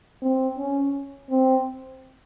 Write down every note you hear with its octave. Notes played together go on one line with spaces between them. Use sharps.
C4
C#4
C4